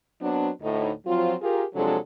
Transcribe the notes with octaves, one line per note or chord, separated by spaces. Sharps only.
F#3 B3 C4 D4
D2 A2 D#4
F3 F#3 C4 F4
F4 G4 G#4 A#4
C3 F3 F#3 G#3 D4 A4